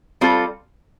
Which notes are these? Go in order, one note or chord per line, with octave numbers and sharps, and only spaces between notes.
G3 C4 F4 A4